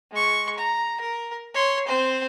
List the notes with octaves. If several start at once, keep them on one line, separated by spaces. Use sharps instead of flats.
G#3 C#6
A#5
A#4
C#5 C6
C4 C5